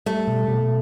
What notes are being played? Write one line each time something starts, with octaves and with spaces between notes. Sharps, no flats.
G3 A3
B2
B2